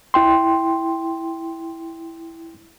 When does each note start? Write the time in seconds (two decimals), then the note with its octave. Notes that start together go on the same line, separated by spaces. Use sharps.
0.14 E4 G5 C6